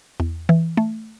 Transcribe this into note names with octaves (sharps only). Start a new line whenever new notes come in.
E2
E3
A3